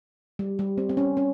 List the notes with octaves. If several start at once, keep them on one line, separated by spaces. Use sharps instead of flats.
G3
G3
C4
C4
C#4
C#4